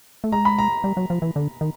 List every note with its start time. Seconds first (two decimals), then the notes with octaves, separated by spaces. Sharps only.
0.24 A3
0.32 G#3 A#5
0.45 B5
0.58 A#5
0.84 G3
0.97 F#3
1.10 F3
1.22 E3
1.36 D3
1.61 D#3